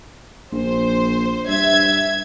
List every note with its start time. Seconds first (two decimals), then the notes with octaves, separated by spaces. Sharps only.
0.52 A#1 C5
1.47 G2 E5 G#6